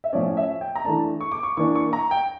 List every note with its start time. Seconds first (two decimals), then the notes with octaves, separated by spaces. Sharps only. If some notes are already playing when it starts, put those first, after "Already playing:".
0.04 E5
0.13 A2 F3 C#4 D5
0.37 E5
0.61 G5
0.75 A#5
0.85 E3 A3 D4 A5
1.21 C#6
1.32 D6
1.43 C#6
1.57 E3 A#3 D4 C#6
1.75 C#6
1.93 A#5
2.11 G5